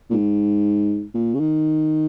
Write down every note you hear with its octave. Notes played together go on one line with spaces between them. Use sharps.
A#2
G#2
A#2
C#3
D#3